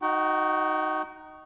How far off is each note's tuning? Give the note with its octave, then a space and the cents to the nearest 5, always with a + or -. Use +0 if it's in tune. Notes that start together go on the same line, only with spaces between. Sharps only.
D#4 +0 F#4 +0 G5 -45